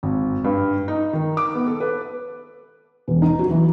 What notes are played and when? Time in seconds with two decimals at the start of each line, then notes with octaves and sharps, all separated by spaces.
0.03 G#1
0.44 G2
0.88 D#4
1.13 D#3
1.37 D6
1.54 B3
1.67 A4
1.80 B4
3.08 E1
3.22 D#4
3.39 F#3
3.51 E3